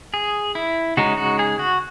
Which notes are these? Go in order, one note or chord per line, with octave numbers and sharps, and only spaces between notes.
G#4
E4
C#3 G#3 D#4 F#4
F#4
G#4
F#4